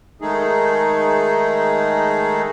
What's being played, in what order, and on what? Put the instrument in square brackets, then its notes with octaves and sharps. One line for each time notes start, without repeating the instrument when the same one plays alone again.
[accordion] D#3 G#3 A3 D#4 G#4